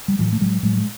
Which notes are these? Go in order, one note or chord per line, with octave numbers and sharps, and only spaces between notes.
G3
A2 E3 F#3
A3
A2 F#3 G#3
A2 F#3 G#3
G#3